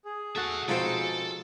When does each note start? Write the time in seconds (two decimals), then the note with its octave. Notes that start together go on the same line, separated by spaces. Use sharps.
0.05 G#4
0.36 F#4 A4 E5 F#5
0.68 G#2 B2 F3 C4 A4 C5